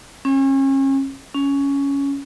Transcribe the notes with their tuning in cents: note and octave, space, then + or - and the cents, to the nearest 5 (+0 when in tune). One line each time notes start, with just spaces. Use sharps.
C#4 -35
C#4 +10